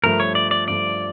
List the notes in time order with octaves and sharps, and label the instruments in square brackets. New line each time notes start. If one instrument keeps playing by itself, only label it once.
[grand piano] G2 F3 A3 [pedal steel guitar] A#4
[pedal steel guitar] C#5
D5
D5
[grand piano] G2 F3 A3 [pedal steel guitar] D5